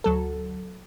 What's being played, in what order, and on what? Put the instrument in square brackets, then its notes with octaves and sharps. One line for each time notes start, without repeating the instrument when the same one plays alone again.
[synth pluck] D2 F#3 A4